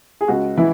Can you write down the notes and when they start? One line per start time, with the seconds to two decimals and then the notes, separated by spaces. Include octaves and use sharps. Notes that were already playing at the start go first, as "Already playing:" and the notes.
0.21 G#4
0.28 C#2 F#4
0.57 E3 E4